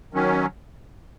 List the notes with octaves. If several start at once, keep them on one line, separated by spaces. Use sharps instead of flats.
D#3 F#3 C#4